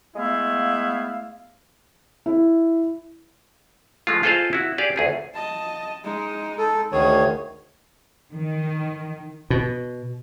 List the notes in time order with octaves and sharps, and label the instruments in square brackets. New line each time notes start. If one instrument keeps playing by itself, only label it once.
[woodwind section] G#3 A3 B3 E4 F5
[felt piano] E4
[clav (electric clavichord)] F3 G#3 A3 F4
F4 G#4 A4 C5 D#5 F5
E4 F#4
G4 G#4 D5 F5
D2 G#4 A4
[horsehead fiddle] D#5 A5
G#3 D#4
[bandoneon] A4
[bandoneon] D2 D#3 C#5 [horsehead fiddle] G#4
[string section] D#3
[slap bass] B2